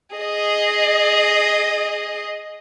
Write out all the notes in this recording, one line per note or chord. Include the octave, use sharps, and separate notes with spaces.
G#4 D#5